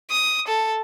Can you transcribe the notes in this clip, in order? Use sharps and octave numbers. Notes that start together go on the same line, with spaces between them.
D#6
A4